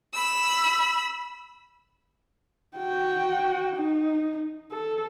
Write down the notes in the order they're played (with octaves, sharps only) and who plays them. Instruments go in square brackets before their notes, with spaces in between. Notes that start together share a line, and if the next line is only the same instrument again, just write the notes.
[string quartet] B5 E6
[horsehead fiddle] F#4 G5
D#4
A4